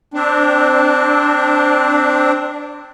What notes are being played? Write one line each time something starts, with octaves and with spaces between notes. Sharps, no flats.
C4 D4